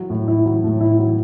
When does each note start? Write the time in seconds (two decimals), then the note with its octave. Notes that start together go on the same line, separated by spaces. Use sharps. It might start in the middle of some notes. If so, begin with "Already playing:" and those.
Already playing: F#3 E4
0.10 A2
0.28 E4
0.46 F#3
0.64 A2
0.81 E4
0.99 F#3